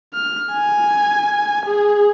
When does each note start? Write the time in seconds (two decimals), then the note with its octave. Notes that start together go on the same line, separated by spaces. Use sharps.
0.14 F6
0.53 G#5
1.66 G#4